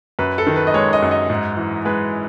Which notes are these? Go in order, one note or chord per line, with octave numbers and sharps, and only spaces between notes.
F#2 B4
A4
D#3
B4
D#5
G#3 C#5
D#5
F#2
D#5
G#2
E3
G#3 B4